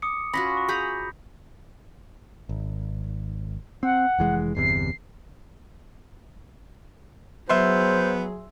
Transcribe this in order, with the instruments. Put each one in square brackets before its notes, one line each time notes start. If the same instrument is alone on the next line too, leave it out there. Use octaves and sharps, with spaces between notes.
[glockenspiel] D6 D#6 C#7
[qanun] C#4 F4 F#4 [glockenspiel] B5 A#6 B6
[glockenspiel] C#6
[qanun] G#4 A#5 B5 [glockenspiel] C#6 G6 B6
[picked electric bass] G#1
[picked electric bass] C4 [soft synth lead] F#5
[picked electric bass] F1 E3 G#3
[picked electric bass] G1 E2 C3 [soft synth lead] C7
[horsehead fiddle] F#3 G#4 [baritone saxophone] B3 [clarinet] C5 [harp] E5 C6